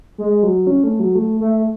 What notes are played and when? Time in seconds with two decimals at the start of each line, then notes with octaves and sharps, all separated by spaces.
0.18 G#3
0.43 F#3
0.67 C#4
0.84 A3
1.00 F#3
1.15 A3
1.40 A3